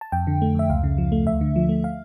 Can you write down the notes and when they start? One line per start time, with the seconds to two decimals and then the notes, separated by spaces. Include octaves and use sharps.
0.01 A5
0.12 F2 G5
0.27 D3
0.42 A3
0.55 F2 E5
0.70 C#2 F5
0.84 C#3
0.98 F3
1.12 A3
1.27 D2 E5
1.41 D3
1.56 F3
1.69 A3
1.84 F5